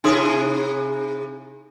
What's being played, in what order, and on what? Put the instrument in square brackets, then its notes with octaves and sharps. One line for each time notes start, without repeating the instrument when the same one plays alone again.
[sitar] C3 E4 G#4 [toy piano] D#4 C6 D#6